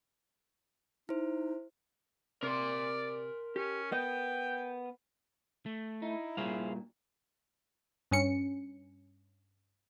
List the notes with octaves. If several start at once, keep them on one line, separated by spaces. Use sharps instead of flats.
D#4 E4 C5
C3 A#4 D5 C6
C#4 G4
B3 D#5 G5
A3
D#4 E4
G2 A#2 G#4 C5 F5
G2 C#4 C#7